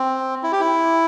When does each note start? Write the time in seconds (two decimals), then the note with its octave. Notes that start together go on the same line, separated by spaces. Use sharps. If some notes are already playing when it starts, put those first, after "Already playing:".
Already playing: C4
0.43 E4
0.52 G4
0.61 E4